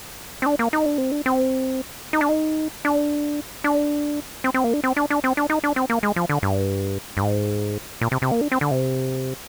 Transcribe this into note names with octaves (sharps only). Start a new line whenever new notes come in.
C4
D4
A#3
D#4
D4
C4
D4
C4
D#4
D4
D#4
D4
D4
C4
C4
A#3
D4
C4
D4
D4
C4
D4
D#4
D4
C4
A#3
G#3
F3
D3
G2
G2
G#2
A#2
C3
C3
A#3
D4
C4
D3
C3